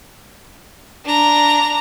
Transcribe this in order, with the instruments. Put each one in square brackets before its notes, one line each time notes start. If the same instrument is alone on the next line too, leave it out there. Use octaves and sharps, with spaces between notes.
[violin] D4 A#5